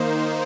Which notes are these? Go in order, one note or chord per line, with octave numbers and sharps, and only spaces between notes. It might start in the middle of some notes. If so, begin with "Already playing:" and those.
Already playing: D#3 A#3 D#4 C5